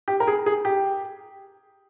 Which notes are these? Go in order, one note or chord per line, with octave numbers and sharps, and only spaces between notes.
G4
A#4
G#4
G#4
G4